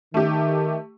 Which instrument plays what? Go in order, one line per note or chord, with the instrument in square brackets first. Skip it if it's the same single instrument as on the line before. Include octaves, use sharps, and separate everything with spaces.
[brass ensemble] D#3 [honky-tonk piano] A3 G4